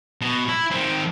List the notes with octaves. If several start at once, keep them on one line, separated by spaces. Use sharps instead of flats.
B2
E4
D#3 C4